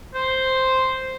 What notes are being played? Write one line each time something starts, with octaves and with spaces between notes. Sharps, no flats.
C5